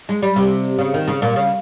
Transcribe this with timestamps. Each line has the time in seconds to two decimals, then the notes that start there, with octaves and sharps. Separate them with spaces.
0.09 G#3
0.23 G3
0.36 C3
0.79 C#3
0.94 D#3
1.08 C#3
1.22 A#2
1.36 C#3